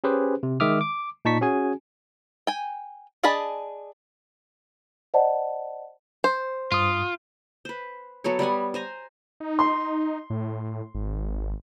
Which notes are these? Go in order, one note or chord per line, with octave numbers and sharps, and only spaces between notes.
C#4 G4 G#4 B4 C5
C3
D#3 G#3 E5 D6 D#6 F6
D6
A#2 D#4 A5 C#6 B6
C#4 F#4 G#4 G#5
G5 G#5
D4 G#4 D#5 A5 B5
C5 D5 D#5 F#5 A5
C5
G2 F4 D#6
B4 C5
F#3 B3 A4 C#5
G3 B3 F#5 G#5
C5 G#5 A#5
D#4
C6
A2
G#1